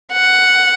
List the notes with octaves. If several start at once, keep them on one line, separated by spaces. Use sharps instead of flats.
F#5